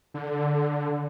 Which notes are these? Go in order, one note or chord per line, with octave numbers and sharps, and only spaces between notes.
D3